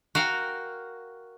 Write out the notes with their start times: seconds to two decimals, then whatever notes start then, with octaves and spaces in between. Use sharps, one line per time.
0.15 F#4 A#4 F5 G5